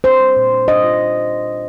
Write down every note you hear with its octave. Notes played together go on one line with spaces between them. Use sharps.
D4 C5
G3
A#2
D4
D4 D#5
F4